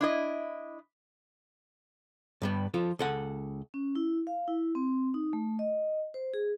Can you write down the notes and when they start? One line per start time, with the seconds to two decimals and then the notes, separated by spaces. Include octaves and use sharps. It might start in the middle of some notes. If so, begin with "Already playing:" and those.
0.01 D4 E4 D#5
2.42 G2 G3 B3
2.74 F3 F4 A4
2.99 C#2 A4 F#5
3.74 C#4
3.95 E4
4.27 F5
4.48 E4
4.75 C4
5.14 D#4
5.33 A3
5.59 D#5
6.14 C5
6.34 G#4